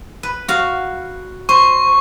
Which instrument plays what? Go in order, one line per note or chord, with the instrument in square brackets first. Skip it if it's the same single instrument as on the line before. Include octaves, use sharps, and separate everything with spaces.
[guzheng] B4
F#4 F5
[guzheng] C5 [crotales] C#6